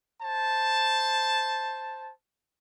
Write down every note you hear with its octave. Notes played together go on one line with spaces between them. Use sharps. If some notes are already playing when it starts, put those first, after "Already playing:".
C5 A5